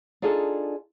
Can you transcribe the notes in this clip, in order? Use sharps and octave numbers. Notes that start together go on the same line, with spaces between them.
D4 D#4 F4 G#4 A4